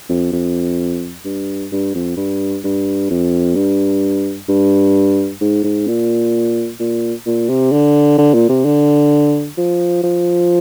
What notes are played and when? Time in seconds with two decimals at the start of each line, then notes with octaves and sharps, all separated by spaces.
0.09 F2
0.33 F2
1.25 G2
1.72 G2
1.95 F2
2.17 G2
2.64 G2
3.10 F2
3.56 G2
4.49 G2
5.41 G#2
5.64 G#2
5.87 A#2
6.80 A#2
7.26 A#2
7.49 C3
7.72 D3
8.18 D3
8.34 A#2
8.49 C3
8.65 D3
9.57 F3
10.03 F3